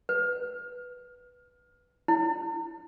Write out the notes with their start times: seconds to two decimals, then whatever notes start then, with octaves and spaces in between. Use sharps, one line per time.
0.09 B4
2.08 E4